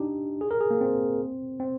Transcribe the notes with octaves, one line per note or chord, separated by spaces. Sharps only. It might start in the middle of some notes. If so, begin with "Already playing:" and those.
Already playing: D4 D#4 G4
G#4
A#4
G#4
A#3
C4
C4